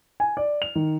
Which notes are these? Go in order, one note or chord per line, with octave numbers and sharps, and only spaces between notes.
G#5
D5
F7
D#3